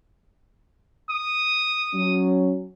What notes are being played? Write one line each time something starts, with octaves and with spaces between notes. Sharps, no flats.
D#6
F#3 C#4